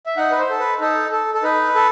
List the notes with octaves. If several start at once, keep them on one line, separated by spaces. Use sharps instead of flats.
E5
D#4 F#5
B4
C5
A4
B4
D#4 A4
A4
A4
D#4 B4
A4